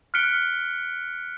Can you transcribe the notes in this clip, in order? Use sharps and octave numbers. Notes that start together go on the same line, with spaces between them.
F6 F#6 B6 C#7 D7 G7